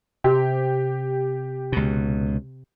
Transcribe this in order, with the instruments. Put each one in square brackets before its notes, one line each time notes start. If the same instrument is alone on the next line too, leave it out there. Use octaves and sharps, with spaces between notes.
[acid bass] C3 [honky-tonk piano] G4
[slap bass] C#2 B2